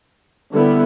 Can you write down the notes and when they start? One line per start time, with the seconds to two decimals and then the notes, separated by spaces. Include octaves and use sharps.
0.53 D3 G3 B3 E4